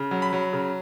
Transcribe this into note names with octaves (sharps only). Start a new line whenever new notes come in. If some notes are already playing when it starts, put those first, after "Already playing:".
Already playing: C#3
F#3
B5
F#3
C#3